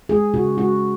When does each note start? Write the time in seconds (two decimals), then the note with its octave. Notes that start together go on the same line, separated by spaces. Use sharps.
0.09 G#3 G#4
0.34 C#3 F#4
0.58 G#3 F#4